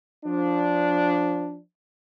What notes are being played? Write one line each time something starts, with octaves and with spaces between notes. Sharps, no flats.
F3 D4